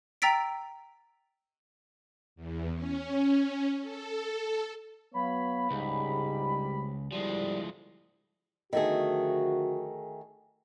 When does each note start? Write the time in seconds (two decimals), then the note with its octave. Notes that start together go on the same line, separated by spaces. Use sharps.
0.22 G5 A#5 E6 A6 B6 D7
2.36 E2
2.74 C#4
3.80 A4
5.14 F#3 B3 C#5 F5 B5
5.71 F#1 C#2 G#2 C3 G3
7.12 D2 F3 G3 G#3 E4
8.73 D3 D#3 F3 A3 F#4 G#4